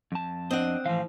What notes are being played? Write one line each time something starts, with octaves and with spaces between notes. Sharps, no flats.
F2 A5
C4 D4 D#5 F#5
A2 E3 F3 F5